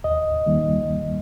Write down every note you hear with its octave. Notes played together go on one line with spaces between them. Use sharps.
D#2 D#5
D#3 G3 A#3